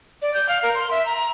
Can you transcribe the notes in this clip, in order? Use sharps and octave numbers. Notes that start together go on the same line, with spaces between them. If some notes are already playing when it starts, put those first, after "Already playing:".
D5
G6
F5
A#4
C6
E5
A#5